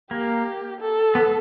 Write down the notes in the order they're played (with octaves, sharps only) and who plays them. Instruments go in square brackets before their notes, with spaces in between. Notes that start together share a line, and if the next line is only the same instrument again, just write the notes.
[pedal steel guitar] A#3 [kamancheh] G4
[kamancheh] A4
[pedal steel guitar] B3